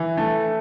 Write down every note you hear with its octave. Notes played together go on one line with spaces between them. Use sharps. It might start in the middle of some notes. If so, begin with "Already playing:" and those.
Already playing: E3
A3